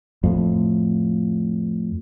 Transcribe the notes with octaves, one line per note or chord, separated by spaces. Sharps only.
F2 A2